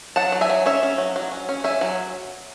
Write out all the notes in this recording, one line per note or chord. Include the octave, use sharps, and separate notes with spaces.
F#3 F#5 A5
F#3
E5 G#5
F#3
C#4 C#5 E5
C#4
F#3
F#3
C#4
C#4
C#4 E5 G#5
F#3